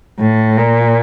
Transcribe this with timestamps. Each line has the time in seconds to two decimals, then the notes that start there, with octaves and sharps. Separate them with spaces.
0.19 A2
0.57 A#2